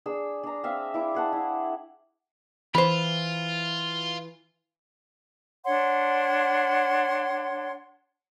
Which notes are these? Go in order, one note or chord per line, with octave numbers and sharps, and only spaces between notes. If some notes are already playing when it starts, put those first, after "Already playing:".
D4 G#4 E6
D4 A#5
C4 E5 F5
E4 D6
G#4 F#5 A5
E4
E3 F4 C5 B5
D4 C#5 F#5 C6